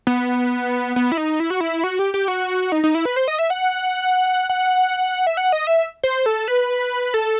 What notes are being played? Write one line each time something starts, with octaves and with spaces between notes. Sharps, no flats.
B3
B3
E4
D#4
E4
F#4
E4
F#4
G4
G4
F#4
D#4
D#4
E4
B4
C5
D#5
E5
F#5
F#5
E5
F#5
D#5
E5
C5
A4
B4
A4